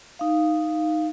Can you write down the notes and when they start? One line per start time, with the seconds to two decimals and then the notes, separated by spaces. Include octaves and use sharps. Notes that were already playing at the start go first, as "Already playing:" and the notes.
0.19 D#4 F5